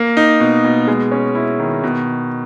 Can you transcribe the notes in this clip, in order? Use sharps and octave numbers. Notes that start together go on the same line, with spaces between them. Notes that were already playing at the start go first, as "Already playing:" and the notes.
Already playing: A#3
D#4
B2
B2
G#3
C#4
E4
D#3
B2